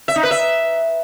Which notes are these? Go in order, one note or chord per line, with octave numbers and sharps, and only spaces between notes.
E5
D#4
B4
E5